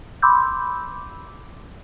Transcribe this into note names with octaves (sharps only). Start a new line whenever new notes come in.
B5 C6 D6 E6 G6